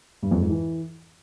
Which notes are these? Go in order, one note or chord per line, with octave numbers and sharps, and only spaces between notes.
G2
F2
G#2
E3